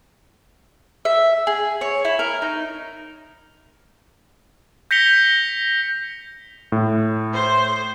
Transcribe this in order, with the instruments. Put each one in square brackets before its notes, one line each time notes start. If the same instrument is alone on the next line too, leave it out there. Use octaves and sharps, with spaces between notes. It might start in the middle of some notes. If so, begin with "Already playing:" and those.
[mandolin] E5
G#4
C#5
E4
A#4
D#4
[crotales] G6 A#6 B6 C#7 F7 G7
[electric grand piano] A2
[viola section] C5